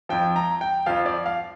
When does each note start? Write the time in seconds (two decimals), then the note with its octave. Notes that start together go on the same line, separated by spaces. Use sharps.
0.09 F2 F3 G5
0.36 A#5
0.61 G5
0.86 F2 F3 F5
1.06 D5
1.26 F5